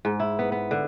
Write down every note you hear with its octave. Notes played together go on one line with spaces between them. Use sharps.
G#2
E4
B3
B3
D3